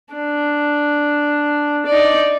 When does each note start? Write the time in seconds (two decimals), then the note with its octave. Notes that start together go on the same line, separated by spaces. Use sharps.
0.14 D4
1.86 D#4 D5